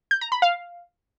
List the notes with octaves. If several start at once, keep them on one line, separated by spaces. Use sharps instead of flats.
G6
A#5
B5
F5